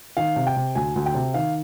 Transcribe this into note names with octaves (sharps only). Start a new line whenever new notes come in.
D#3 F5
C3
G5
C3
D2 G#5
D2
G5
C3
D#3 F5